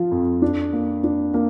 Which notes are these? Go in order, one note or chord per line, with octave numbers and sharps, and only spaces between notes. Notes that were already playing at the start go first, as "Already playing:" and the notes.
Already playing: F3 F4
F2
D4
A#3
D4
A#3